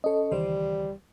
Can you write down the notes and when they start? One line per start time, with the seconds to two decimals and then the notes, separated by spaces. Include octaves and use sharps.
0.04 C#4 A4 C#5 D#5
0.32 C#2 D#3 E3 G3 C5